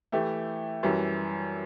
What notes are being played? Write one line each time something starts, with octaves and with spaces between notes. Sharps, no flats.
E3 A3 E4 G4
F#2 E3 G3